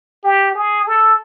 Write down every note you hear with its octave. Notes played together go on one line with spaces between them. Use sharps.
G4
G#4
A4